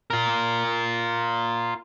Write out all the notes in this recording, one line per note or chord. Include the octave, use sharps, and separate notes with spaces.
F4 A#4